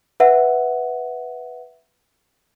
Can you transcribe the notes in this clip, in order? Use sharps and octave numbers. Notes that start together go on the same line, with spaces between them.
B4 E5 F#5